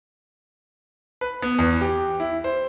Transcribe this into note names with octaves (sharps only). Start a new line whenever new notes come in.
B4
B3
E2
G4
E4
C5